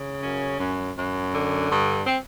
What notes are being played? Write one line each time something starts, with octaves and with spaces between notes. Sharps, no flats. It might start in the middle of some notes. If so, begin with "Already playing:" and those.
Already playing: C#3
F#2 C#4
F#2
F#2
D3
G2
C4